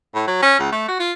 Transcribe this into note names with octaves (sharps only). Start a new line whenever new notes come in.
A2
F#3
C#4
C#2
A3
F#4
F4